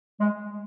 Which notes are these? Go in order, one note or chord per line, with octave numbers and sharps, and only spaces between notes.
G#3